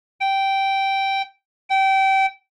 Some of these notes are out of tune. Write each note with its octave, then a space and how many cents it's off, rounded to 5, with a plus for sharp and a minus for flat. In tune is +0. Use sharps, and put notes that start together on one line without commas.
G5 -10
G5 -25